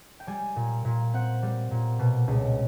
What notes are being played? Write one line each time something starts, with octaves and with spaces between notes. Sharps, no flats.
G5
G3 G#5
A#2
A#2
C4 F#5
G3
A#2
B2
C#2